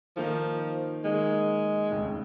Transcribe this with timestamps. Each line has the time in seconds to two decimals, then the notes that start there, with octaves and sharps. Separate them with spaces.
0.17 D#3 F3 A#3 D#4
1.04 D#3 G#3 A#3 D#4
1.91 F1 D#2 C#3